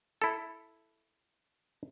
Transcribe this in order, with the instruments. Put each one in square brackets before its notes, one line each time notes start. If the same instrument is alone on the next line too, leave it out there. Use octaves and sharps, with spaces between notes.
[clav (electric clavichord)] E4 A4